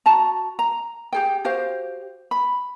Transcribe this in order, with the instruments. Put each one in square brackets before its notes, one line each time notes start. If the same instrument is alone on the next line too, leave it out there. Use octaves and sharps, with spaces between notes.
[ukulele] F#4 A5 A#5
A#5
G4 G#4 G5
F#4 G4 C5 F5
B5